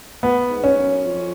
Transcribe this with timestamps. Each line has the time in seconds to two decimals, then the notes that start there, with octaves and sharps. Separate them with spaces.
0.23 B3
0.50 G#2
0.64 C#4
0.78 F#2
1.06 F2